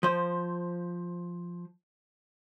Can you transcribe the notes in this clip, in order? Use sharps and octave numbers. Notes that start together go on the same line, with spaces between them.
F3 C5